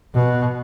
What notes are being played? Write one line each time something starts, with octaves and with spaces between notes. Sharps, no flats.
B2